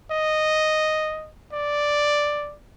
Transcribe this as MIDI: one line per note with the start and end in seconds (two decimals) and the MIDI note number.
0.11 1.30 75
1.53 2.55 74